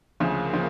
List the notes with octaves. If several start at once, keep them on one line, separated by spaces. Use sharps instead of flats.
D2 C#3 F3 A#3
C#3 F3